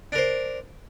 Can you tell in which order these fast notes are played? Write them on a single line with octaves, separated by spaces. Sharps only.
D4 A#4 C5